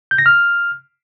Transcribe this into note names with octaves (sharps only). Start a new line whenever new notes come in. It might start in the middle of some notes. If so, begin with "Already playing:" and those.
G6
A#6
F6